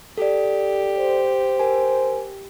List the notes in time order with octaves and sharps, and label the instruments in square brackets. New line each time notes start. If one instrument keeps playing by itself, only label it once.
[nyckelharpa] G4 [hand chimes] A4 D5
[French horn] C5
[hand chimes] A#4 G#5